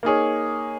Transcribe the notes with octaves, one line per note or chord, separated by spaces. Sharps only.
A#3 D#4 G#4 C#5